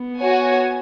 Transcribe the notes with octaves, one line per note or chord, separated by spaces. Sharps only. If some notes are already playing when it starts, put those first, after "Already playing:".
Already playing: B3
F#4 C#5 G#5